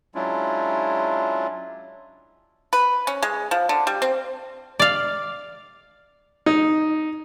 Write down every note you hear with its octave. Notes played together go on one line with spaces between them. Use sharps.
F#3 G#3 C#4 D4 E4 F4
B4
C#4
G#3
F3
D3
G3
C4
D5 F5
D#4